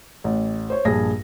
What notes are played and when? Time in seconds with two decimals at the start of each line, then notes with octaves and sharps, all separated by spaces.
0.24 A1
0.70 C5 C#5
0.85 A#1 G2 G#4 A#6